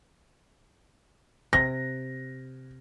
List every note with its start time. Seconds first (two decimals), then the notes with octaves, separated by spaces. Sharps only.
1.53 C3 A#6